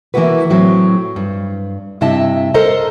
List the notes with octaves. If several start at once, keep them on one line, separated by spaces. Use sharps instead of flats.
E3 A#3 B3 E4 F#4 B4
A2 F#3 C4
G2
G2 C3 E4 D#5 E5 A5
A4 A#4 C5 D#5 A#5